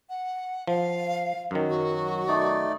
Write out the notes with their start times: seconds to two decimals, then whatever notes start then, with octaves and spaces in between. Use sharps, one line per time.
0.09 F#5
0.67 F3 F5
1.51 F#2 D#3 F#3
1.70 F#4
2.28 A3 D#4 D5